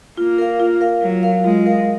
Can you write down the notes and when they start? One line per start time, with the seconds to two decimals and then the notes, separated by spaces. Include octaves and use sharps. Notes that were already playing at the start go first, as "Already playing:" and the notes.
0.17 A#3 F4
0.38 A#4 F5
0.60 F4
0.81 A#4 F5
1.02 F#3 F4
1.23 A#4 F5
1.44 G#3 F4
1.66 A#4 F5